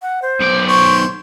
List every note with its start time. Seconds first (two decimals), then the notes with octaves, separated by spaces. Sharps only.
0.02 F#5
0.22 C5
0.41 B1 D5
0.68 C5 C#5 C#6